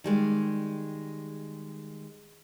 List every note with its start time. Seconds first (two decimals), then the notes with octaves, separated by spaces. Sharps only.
0.04 D#3 G3 G#3